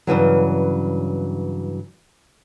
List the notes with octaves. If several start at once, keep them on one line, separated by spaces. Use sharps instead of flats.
G2 C#3 E3 F#3